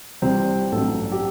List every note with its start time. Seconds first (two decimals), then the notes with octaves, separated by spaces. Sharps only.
0.22 C2 C3 G3 C4
0.72 A1 G2 F#3 A4
1.12 G4